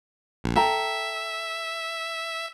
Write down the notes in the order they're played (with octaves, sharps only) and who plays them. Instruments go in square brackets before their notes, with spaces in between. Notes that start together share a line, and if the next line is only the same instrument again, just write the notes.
[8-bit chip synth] A#1
[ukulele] A4 G5 A#5 [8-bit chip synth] E5